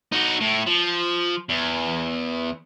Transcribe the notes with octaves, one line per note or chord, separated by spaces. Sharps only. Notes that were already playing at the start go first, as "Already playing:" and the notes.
D#4 F#4
A2
F3
E2